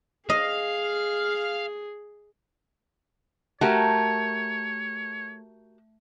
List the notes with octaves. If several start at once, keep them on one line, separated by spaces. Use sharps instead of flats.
G#4 D#5 F5
A3 F#4 G4 A#4 C#5